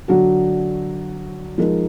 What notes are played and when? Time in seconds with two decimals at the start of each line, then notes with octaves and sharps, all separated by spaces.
0.08 D3 F#3 D4 F#4
1.58 F3 G#3 D#4 A#4